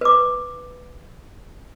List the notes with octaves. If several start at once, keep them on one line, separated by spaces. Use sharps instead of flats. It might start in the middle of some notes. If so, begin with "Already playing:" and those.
B4 D6